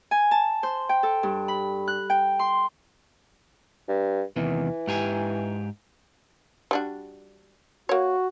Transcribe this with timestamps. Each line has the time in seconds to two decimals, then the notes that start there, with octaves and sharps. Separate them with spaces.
0.11 G#5
0.31 A5
0.63 C5
0.89 G5
1.03 A4
1.23 G2
1.48 B5
1.88 F#6
2.10 G5
2.39 C6
3.88 G2
4.36 E2 C3 D#3 E3
4.87 G#2 G4 G#5
6.71 G3 D4 F#4
7.89 A#3 F#4 C#5